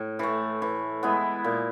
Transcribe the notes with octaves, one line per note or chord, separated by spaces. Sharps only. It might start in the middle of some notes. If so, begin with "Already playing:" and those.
Already playing: A2
E3 A3
E3
G#3 B3 E4
A#2